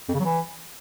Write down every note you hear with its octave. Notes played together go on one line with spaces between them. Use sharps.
F2
C#3
F#3
E3